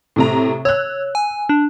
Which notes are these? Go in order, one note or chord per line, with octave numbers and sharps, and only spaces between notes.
A2 C3 A#5
C#5 E6 F#6
G#5
D4